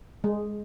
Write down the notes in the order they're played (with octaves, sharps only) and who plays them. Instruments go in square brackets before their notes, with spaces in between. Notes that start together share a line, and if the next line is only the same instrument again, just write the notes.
[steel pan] G#3